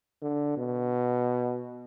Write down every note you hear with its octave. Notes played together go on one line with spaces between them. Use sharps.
D3
B2